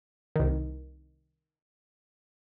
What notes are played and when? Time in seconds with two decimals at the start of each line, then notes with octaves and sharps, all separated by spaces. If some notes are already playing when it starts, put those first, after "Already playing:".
0.36 C2 D#3